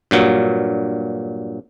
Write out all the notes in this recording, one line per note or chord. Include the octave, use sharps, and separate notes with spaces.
G2 A#2 F#3